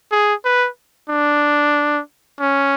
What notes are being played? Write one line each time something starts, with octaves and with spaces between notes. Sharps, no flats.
G#4
B4
D4
C#4